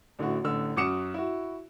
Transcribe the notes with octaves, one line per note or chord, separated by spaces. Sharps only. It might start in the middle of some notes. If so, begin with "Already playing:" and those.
A1 D3 E4 F#4
A1 D3 E6
F#2 F#4 D6 D#6 C#7 E7
E4 F#4